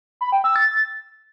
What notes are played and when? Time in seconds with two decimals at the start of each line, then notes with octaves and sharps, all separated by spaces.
0.21 B5
0.32 G5
0.44 E6
0.56 A6